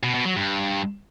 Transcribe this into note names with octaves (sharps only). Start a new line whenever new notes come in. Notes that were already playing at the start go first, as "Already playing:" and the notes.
B2
B2
F#3
G2